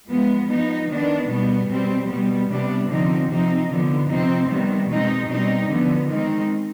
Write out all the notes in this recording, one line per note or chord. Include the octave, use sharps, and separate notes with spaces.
F3 G#3 B3
F3 B3 D#4
D#3 B3 D4
B2 G3 B3
B2 G3 C4
B2 G3 B3
C3 G3 B3 D4
D3 F3 C4 D#4
C3 F3 C4 D#4
D3 F3 B3
C3 F3 C4 D#4
C3 D#3 G3 B3
B2 G#3 C4 D#4
B2 G3 C4 D#4
D3 F3 B3
D#3 G#3 C4 D#4